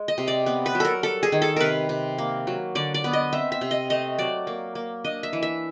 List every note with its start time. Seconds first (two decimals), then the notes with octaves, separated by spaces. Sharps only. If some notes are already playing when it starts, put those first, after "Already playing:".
Already playing: G#3
0.08 D#5
0.18 C3
0.28 D5
0.46 B3
0.66 B4
0.75 F#3
0.80 A4 A#4
1.03 G3 A4
1.23 G#4
1.32 D#3
1.42 A4
1.56 C3 A#4 B4
1.89 C3
2.18 A#3
2.47 F#3
2.75 D3 D5
2.94 D5
3.04 B3
3.13 D#5
3.33 C4 E5
3.52 E5
3.61 C3
3.71 D#5
3.90 A3 D#5
4.18 F#3 D5
4.47 A#3
4.75 A#3
5.04 D4 D#5
5.23 E5
5.33 E3
5.43 E5